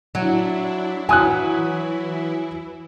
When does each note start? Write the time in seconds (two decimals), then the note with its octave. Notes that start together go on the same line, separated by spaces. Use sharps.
0.15 F#3 D4 E4
1.09 E3 F#3 E4 G#5 D#6 F#6